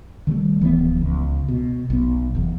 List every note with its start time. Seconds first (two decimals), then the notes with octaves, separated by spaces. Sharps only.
0.27 D#3 E3 G3 A3
0.61 D1 E3 F3 B3
1.01 C#2
1.48 B2
1.90 B1 B3
2.35 F1 E2